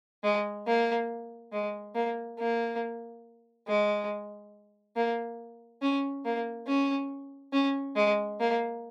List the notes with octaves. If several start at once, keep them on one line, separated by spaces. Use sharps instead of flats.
G#3
A#3
G#3
A#3
A#3
G#3
A#3
C#4
A#3
C#4
C#4
G#3
A#3